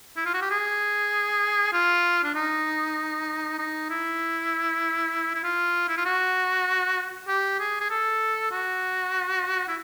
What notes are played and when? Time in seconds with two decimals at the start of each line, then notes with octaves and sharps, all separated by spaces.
0.16 E4
0.26 F4
0.34 F#4
0.41 G4
0.50 G#4
1.73 F4
2.23 D4
2.35 D#4
3.58 D#4
3.90 E4
5.35 E4
5.43 F4
5.89 E4
5.97 F4
6.05 F#4
7.28 G4
7.60 G#4
7.80 G#4
7.90 A4
8.51 F#4
9.68 E4